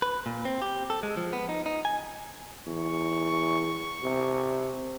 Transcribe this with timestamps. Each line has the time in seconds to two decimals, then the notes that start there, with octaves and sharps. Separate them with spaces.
0.02 B4
0.26 A#2
0.45 C4
0.62 G4
0.90 A4
1.03 G#3
1.17 F3
1.33 B3
1.49 D#4
1.66 D#4
1.85 G#5
2.67 E2 C#6
4.03 C3